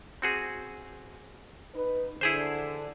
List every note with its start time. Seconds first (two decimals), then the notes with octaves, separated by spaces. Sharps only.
0.22 C4 F#4 G#4
1.75 D#4 B4
2.21 D3 E4 G#4 C5